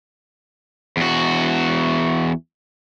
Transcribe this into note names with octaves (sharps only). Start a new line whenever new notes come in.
E2 F#4